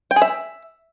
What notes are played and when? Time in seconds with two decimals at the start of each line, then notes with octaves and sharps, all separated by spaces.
0.11 G5
0.16 G#4
0.22 E5